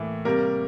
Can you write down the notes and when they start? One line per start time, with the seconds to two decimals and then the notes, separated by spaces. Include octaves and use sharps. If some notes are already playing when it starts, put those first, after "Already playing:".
Already playing: A2 E3 A#3
0.25 C3 G3 A#3 A#4